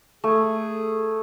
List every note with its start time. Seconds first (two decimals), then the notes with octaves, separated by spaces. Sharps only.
0.24 A3 G#4